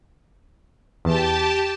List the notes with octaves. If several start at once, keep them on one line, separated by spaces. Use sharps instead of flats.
E2 G4 A5